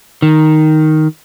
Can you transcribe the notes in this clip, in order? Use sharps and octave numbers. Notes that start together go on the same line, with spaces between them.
D#3